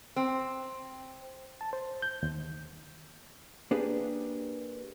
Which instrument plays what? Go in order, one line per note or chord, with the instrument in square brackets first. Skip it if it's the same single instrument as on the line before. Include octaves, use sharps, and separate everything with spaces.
[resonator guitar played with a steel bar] C4
[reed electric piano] A5
C5
G6
D#2
[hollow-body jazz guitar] A#3 D4 G4 G#4 B4